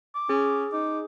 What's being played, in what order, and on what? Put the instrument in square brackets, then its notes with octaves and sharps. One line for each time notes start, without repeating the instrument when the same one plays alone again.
[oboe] D6
[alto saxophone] C#4 [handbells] G#4
[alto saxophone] D#4 [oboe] D6